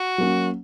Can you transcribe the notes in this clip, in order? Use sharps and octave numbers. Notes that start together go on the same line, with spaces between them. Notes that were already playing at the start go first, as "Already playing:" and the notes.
Already playing: F#4
F#3 A#3 C#4